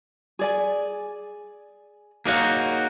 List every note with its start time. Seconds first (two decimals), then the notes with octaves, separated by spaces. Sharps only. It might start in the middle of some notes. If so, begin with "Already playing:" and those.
0.39 G#4 D5 G#5
2.26 A#3 D#4 F#4 G#4 C#5 F5